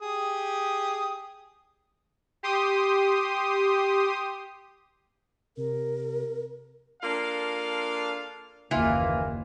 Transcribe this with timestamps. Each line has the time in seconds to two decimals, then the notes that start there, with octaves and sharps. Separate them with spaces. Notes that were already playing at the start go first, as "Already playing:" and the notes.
0.01 G4 G#4 D#6
2.43 G4 C6 D#6
5.57 C3 A#4
7.03 A#3 D4 F4 A4 F5
8.71 F#1 D#2 E3 A#3 F4